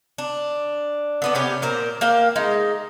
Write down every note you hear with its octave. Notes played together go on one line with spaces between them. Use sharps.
D4
D3 B3 D4
C3 B3 C#4 G4
A#2 A#4 C5
A#3 F5 G5
G#3 D#4